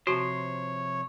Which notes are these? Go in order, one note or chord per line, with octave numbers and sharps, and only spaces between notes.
C3 F3 F#4 C5 C#5